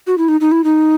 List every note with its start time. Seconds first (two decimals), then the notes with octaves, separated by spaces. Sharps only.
0.07 F#4
0.18 E4
0.28 D#4
0.41 D#4
0.52 E4
0.64 D#4